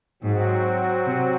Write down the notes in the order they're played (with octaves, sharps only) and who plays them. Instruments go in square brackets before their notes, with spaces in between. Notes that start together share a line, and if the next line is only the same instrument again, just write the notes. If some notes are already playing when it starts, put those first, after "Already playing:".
[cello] G#2 [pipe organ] F#3 C4 F#4
[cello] C3